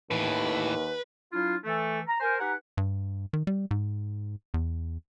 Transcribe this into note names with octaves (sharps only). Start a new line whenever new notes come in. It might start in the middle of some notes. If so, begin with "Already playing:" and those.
D#2 A2 E3 B4
F#3 D4 E4 F4
E3 A3 A4
A#5
A#4 C5 G#5
D#4 G4 B4 F#5 G#5 A#5
G2
D#3
G3
G#2
E2